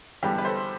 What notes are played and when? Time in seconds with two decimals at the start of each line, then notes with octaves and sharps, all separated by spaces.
0.23 E2 D3 G3 G4 B4
0.38 B4
0.45 A4 C5